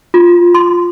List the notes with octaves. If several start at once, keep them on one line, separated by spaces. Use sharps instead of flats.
F4
C6